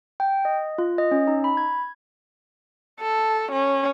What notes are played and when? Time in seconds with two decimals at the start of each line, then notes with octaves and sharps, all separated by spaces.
0.20 G5
0.45 D#5
0.78 F4
0.98 D#5
1.11 C#4
1.28 D#4
1.44 B5
1.57 G#6
3.00 A4
3.52 C#4